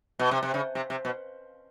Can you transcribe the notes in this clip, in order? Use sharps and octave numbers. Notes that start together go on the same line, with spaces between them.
B2
C3
C3
C#3
C3
C3
B2